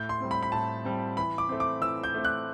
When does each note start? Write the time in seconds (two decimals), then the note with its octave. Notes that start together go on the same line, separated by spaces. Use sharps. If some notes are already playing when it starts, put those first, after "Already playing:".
Already playing: A2 G6
0.09 C6
0.20 G3 C4
0.31 B5
0.43 B5
0.52 A2 A5
0.85 G3 C4
1.17 E3 B5
1.38 D6
1.49 A3 C4
1.60 D6
1.81 E3 E6
2.03 G6
2.14 A3 C4
2.25 F#6